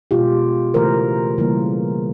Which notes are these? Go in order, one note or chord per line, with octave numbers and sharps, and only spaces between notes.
B2 G#3 F4 G4
C#3 E3 A3 A#4 C5
C#3 E3 G3 A#3